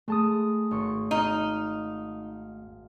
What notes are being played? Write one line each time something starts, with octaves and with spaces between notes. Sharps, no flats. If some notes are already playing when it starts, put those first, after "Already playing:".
G#3 A3 A5 D#6
G#1 C#6
D#4 D#5 F5 D#7